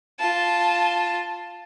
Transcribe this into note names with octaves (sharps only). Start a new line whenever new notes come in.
F4 A5